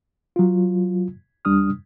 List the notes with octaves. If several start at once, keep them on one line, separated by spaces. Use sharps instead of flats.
F#3 F4
D#2 G3 D4 D#6 F6